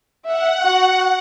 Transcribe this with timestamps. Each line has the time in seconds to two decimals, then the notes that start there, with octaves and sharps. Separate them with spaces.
0.25 E5 F#5
0.61 F#4